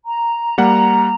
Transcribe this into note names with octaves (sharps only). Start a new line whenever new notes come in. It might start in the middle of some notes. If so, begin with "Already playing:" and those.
A#5
G3 A#3 F#5 A#5